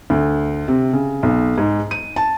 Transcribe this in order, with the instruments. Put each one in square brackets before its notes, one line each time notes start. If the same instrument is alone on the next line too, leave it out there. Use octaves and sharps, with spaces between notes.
[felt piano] D2
C3
C#3
B1
G#2
D#7
A5